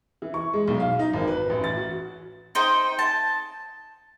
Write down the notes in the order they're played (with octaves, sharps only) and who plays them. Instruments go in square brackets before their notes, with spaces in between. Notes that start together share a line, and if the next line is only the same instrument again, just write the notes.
[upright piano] E3
C#6
G#3
B1
F5
D#4
G#1
B4
A1
A6
F#4
[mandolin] D#4 C5 D#5 G5
A5